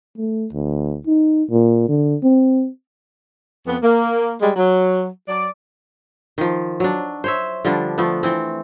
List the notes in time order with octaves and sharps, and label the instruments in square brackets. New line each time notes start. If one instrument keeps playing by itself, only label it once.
[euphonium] A3
D2
D#4
A#2
D3
C4
[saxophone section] F2 B3
A#3
G3 G#3
F#3
F#3 D5
[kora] D#3 F3
F#3 D4
C5 C#5 E5
D3 F3 G3 D4
F3 A3 B3
E3 C4